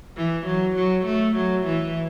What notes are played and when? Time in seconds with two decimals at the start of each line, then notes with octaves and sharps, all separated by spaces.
0.16 E3
0.46 F#3
0.76 F#3
1.05 A3
1.36 F#3
1.66 E3